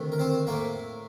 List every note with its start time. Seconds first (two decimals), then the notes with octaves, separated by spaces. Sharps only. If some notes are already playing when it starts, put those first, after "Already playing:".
Already playing: D2 C3 D#3 A3
0.12 A#4
0.19 C4 C5
0.47 A2 A3 A#3 A#4